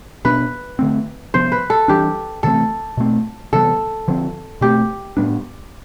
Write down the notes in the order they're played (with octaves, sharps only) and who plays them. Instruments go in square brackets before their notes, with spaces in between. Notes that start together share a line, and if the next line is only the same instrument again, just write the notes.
[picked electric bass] B2 B3 D4 [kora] B4
[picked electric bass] D3 A3 C4
[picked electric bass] C3 F3 B3 [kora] C5
[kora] B4
A4
[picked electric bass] E3 G3 D4 [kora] G4
[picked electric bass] C3 E3 A3 C4 [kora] A4
[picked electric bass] B2 A3 C4
[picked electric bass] C3 E3 G3 B3 [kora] A4
[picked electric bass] D3 F3 C4
[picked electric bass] B2 A3 C4 [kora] G4
[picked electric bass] A2 G3 B3 D4